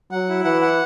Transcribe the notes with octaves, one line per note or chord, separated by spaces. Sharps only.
F#3 F#5
E4
E3 F#5
F#5